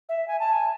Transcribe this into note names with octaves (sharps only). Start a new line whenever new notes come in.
E5
G#5
A5
G#5